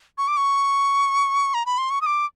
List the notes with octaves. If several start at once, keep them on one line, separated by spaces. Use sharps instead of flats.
C#6
D6
C#6
A#5
B5
C6
C#6
D#6
D6